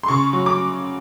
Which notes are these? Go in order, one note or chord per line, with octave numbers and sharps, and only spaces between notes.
C6
C#3 C#6
F#3
D6